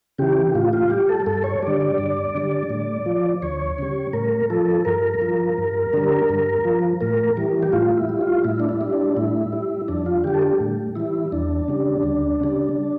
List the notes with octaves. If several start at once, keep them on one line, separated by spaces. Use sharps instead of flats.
C#3 E3 G4
A2 F4
F4
G3 G4
A4
G2 A4
C#5
D3 G3 D5
D5
G2
D3 G3
A2
F3
D2 C#5
C#3 G3
A2 A#4
F3 A4
G2 A#4
F3
G2
D3 G3
G2
F3
A2 A#4
E3 G3
G4
A2 F4
E4
G3
F4
A2 E4
D4
E4
G3
D4
A2 E4
G3
F2 D4
F4
D3 G3 G4
A4
G4
A2
E3 G3 E4
E2 D4
C#3 G3
D2
C#3 G3